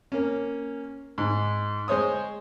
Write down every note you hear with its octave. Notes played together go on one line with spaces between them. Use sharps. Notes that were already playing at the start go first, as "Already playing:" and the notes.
A#3 C#4
G#2
G#3 C5 C#5 D#6